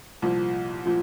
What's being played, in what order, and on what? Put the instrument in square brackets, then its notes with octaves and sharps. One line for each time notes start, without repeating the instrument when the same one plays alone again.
[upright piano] C2 A#2 F3
A#2 F3